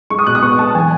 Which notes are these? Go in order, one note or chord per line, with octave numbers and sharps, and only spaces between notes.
G#3 C#6
D#6
B2 F#6
D#6
B3 C#6
G#3 A5
E3 G#5